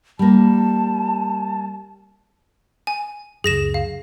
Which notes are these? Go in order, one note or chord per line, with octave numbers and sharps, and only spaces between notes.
G3 A#3 A5
G#5
C#2 F#2 G#4 A#6 E7
F5